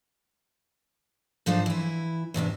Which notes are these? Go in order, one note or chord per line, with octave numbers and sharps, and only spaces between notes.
G#2 F3 A3 D4 D#4 C5
E3 E4
E2 G#2 C3 D4